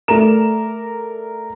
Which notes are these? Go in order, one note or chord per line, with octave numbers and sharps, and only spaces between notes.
A3 A#4 D5 E7